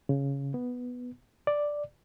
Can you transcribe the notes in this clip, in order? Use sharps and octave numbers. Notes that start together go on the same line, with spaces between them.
C#3
B3
D5